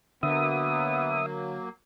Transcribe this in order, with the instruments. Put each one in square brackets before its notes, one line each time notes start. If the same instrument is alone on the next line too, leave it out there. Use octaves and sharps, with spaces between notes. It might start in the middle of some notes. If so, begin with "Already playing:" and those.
[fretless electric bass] D3 [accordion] F#3 A#3 [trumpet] B3 [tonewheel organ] E5 D#6